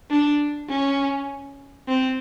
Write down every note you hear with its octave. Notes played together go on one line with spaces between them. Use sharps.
D4
C#4
C4